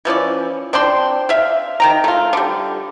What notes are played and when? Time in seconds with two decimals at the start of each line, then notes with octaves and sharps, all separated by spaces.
0.05 E3 F3 C#4 D5
0.73 C4 D4 G5 C6
1.29 E5 F5
1.80 D#3 G5 A#5
2.04 A3 F4
2.33 D3 G3